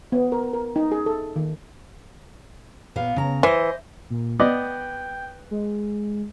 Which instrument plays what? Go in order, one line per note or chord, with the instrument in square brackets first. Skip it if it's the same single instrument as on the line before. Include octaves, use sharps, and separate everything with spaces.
[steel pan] B3
A#4
A#4
D#4
G#4
A4
D#3
[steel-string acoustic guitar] A#2 B3 F5
C#3 A#5
[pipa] E3 [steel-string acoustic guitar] C5 D#5
[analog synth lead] A#2
[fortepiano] B3 D5 D#5 [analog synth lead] G5
[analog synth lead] G#3